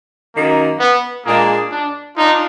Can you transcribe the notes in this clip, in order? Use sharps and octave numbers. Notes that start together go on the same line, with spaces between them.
F#2 D#3 A#3
B3
A#2 G#3 A#3 D4 G#4
D4
D4 D#4 F4